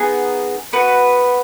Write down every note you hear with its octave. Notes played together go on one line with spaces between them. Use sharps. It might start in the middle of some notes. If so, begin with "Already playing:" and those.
Already playing: B3 D#4 G#4
B3 F#4 B4